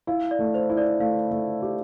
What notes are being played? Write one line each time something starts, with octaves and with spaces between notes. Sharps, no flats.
E4 F5
D5
A3
C5
E4
D5
A3 F5
A3
G4